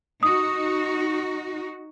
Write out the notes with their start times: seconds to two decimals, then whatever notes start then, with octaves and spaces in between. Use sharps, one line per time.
0.23 D#4 F#4 D#6